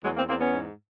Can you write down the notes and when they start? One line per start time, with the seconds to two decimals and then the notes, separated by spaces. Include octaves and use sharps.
0.04 E2 F#3 G#3
0.16 A#3 C4
0.28 E2 A#3 C4
0.40 B3 C#4
0.53 G#2